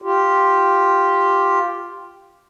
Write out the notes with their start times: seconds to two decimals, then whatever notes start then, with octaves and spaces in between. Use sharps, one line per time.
0.02 F4 G4